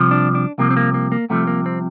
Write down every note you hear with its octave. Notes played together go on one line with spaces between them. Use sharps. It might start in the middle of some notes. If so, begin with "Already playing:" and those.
Already playing: C2 C3 F3
D4
D4
C2 C3 F3 A#3
C4
A#3
A#3
A#3
C2 C3 F3 A3
A#3
C4